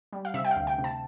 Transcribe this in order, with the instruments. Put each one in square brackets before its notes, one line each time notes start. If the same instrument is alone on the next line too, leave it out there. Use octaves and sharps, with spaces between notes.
[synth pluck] G3
F5
C3 E5
G5
F5
D2
G5
C3
A5